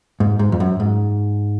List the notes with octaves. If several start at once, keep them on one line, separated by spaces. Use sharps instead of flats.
G#2
G#2
F2
F#2
G#2